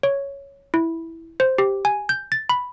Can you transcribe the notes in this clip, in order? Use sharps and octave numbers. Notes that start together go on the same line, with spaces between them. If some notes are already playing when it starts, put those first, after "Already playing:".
C#5
E4
C5
G4
G#5
G6
A6
B5